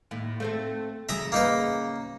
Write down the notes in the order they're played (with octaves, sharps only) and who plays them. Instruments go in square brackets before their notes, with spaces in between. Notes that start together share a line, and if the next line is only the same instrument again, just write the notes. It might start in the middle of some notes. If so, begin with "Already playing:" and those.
[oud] D#2 A2
A3 C4 A4
[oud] C#3 [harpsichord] E5 A#5 D#6
[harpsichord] A#3 D#4 B4